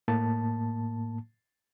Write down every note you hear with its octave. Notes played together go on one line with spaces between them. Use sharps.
A2 A#3 A5